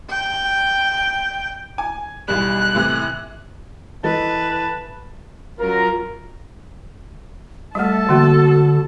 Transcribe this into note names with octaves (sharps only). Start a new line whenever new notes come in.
G5
G#5
B1 E2 G3 F#6
A2 C3 E3
E3 A4 B4 D#5 A5
F#3 C#4 F4 A#4
G3 A3 A4 E5 A5
D3 E3 A#3 F#4